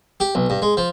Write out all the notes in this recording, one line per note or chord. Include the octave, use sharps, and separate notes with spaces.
G4
B1
G2
G#3
F3